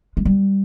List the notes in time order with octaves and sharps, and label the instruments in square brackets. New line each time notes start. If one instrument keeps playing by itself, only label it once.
[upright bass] G#3
G3